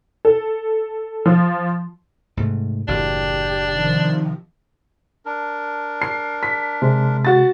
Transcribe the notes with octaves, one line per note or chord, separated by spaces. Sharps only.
A4
F3
G#2 C3 A3
F#1 A2 E3 D4 G4
C3 D#3 F3
D4 A#4
C7
B6
C3 G#3
F#4 A6